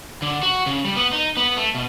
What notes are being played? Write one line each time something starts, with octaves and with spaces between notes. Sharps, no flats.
D3
F#4
C#3
G3
B3
D#4
B3
A3
B2